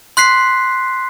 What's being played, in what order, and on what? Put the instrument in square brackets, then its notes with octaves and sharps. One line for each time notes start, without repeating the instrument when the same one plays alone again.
[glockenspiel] C6 F#6 B6 C7